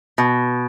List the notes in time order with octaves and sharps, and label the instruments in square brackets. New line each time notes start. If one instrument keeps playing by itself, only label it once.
[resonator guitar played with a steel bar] B2